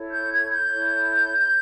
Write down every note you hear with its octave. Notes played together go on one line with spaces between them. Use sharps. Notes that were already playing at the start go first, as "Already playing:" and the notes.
Already playing: E4 A4 C#5
G6
G#6
G6
E4 A4 C#5